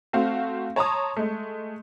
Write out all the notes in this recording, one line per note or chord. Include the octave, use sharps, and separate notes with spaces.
A3 C4 F#4 F5
C#5 A5 A#5 C6 D#6
G#3 A3